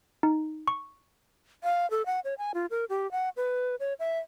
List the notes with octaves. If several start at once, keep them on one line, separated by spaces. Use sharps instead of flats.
D#4
C#6
F5
A4
F#5
C#5
G#5
F4
A#4
G4
F#5
B4
C#5
E5